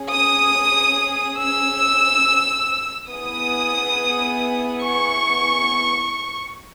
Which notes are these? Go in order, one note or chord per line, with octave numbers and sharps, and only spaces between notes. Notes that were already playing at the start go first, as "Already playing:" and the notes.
Already playing: C#4 G#4
D#6
E6
B3 E4 G#4 D#6
C#6